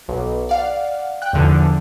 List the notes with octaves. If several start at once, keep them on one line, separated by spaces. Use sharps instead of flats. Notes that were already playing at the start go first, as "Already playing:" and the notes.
B1
D5 F5 F#5
G5 F#6
E2 D3 F3